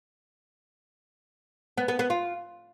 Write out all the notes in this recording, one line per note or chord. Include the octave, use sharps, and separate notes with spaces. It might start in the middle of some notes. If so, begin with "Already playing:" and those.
B3
B3
B3
F4